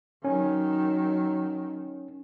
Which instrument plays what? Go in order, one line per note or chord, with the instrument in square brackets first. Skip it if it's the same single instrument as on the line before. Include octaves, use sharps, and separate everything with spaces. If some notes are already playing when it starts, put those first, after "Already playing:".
[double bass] D#3 F#3 [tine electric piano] C#4